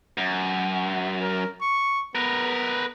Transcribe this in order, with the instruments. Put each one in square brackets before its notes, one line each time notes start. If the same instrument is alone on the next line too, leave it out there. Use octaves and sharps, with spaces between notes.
[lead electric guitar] F#2
[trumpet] A#4
C#6
[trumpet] B3 [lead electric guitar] A#4 B4